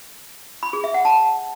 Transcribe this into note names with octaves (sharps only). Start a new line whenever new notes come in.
B5
G#4
E5
F#5
A5